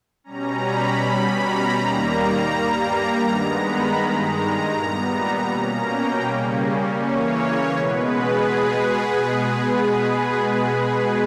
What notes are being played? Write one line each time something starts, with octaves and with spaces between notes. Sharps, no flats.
B2 G3 C#4 A#5
B5
B2 G3 C#4
A#5
D#2 D#3 G3 A#3
A#5
G2 G3 A#3
G2 D#3 G#3 B3
B5
G2 D#3 G#3 A#5
A#5
A#2 G3 B3
B2 A#3 C#4 A#5
G5
C#3 G3 A#3 C#4
C#3 E3 A#3 C#4 C#5
B2 G#3 B3 B4
G#4